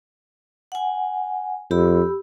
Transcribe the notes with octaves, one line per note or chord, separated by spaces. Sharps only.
F#5 G#5
F2 G4 B5 E6